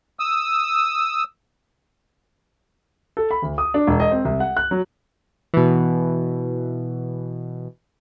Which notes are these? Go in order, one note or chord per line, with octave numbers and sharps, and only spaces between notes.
D#6 E6
A4
B5
D2
D#6
D4
E1
D#5
C4
C2
F#5
F#6
F#3
B2 E3